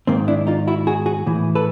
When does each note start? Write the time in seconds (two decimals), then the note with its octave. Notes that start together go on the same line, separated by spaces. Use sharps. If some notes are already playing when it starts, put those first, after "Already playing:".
0.07 G#2 D#3 A#3 C4
0.28 D4 E4
0.47 D#4 F4
0.67 E4 F#4
0.87 F#4 G#4
1.06 F#4 G#4
1.26 A2 E3
1.55 A4 B4